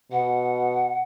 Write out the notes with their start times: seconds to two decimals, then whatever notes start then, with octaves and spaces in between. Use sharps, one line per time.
0.12 B2 F#5